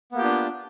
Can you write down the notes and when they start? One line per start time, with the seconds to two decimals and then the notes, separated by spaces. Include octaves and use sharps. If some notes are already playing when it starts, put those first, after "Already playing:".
0.12 B3
0.15 A#3
0.18 G4
0.21 F4
0.24 D4